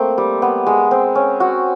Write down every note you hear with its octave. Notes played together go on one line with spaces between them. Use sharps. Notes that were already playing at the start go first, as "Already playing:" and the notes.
Already playing: A3 A#3 C4
G3
B3
G#3
C4
C#4
F#4